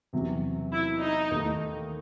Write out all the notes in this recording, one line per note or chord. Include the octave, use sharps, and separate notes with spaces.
E2 C3 F#3 C#4
E4
D#4
D#2 D#3 A3